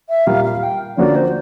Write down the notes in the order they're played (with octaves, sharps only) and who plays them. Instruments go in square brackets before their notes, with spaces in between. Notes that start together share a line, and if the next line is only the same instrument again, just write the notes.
[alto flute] E5
[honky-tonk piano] A#2 G3 A#3 [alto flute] F5
[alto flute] F5
G5
[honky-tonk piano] D3 F3 A#3 C#4 F#4 [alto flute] D5
[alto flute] C5